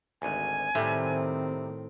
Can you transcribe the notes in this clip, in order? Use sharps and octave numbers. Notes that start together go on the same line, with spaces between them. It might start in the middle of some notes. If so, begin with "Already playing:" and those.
G#1 D2 G#5
A2 C3 D#3 G3 C4